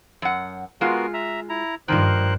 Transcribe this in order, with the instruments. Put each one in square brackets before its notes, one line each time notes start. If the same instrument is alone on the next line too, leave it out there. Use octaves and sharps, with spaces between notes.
[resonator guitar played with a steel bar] F#2 F#5
[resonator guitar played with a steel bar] G#3 F4 [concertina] B3 F#4 A#4
[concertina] E5 A#5
E4 A#5
[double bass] G2 [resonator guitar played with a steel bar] D#3 F3 [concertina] A#4 C5 F#6